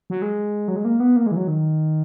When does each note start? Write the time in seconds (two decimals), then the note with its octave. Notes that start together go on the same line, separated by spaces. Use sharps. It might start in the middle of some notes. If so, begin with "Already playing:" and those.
0.10 F#3
0.22 G#3
0.68 F#3
0.76 G#3
0.85 A#3
1.00 B3
1.16 A#3
1.26 G#3
1.31 E3
1.36 F#3
1.47 D#3